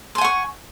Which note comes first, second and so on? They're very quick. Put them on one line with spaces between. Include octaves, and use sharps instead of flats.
C6 G#5 F#5 C#6